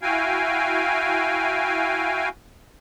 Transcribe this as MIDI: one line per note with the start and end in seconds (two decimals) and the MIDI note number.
0.02 2.29 64
0.02 2.29 66
0.02 2.29 77
0.02 2.29 79
0.02 2.29 80